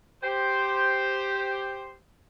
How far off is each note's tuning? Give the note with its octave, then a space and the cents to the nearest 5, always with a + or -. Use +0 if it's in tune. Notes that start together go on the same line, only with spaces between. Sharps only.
G4 +0 C5 +0